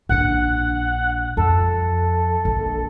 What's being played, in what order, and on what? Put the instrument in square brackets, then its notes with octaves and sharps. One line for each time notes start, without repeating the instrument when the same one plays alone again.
[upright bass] A#1 D4 [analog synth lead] F#5
[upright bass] F2 [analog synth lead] A4
[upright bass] A#1